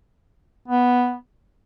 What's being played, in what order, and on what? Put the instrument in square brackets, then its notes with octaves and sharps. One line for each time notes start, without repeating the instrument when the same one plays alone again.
[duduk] B3